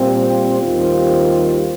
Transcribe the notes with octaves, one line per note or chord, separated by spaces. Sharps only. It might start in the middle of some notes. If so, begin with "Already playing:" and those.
Already playing: A#2 G3 C4 F4
D#2 D#3 G3 C4 F4